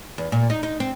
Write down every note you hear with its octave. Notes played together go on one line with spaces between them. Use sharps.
E2
A#2
D#4
D#4
C4